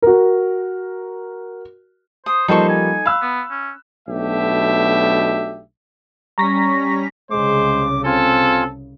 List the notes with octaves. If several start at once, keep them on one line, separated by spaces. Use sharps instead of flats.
F#4 A#4
C5 D#6
F3 G3 A#3 D#4 A4 C5 C#6
G#5
F5 B5 E6 F#6
B3
C#4
B1 B2 A3 D4 G4 E5
G3 C#4 A#5 C#6 A#6 B6
C2 C#3 G#3 C5 D6
C4 F4 A4 G#5